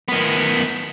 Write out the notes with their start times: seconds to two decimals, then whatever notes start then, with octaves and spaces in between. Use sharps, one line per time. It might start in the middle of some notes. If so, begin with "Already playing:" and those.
0.09 D#3 B3